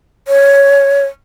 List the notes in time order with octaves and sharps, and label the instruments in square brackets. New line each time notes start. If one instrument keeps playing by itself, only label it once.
[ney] C#5